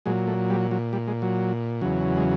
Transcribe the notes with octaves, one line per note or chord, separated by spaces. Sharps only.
A#2 F#3 G#3
A3
G3
F#3
G3
G#3
F#3
E2 C#3 F#3
G#3